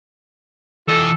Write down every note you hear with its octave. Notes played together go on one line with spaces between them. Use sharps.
E3 F4 G4 A4 D#5